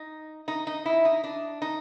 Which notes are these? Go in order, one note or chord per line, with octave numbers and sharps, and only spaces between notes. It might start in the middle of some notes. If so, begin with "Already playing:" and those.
Already playing: D#4
D#4
D#4
E4
D#4
D4
D#4